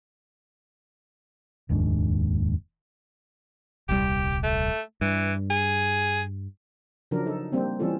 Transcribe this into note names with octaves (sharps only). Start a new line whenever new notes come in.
F1 D#2 G#2 D4
D#1 C2 G3 G4
A3
G2 E3
G#4
C#3 F3 F#3 D4 A#4
D#4 A4
G3 A#3 C4 D4
E3 G3 C4 C#4 F4 A4